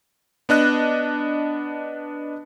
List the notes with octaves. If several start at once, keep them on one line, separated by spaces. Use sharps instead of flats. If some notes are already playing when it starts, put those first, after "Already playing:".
B3 D4 D#5 F#6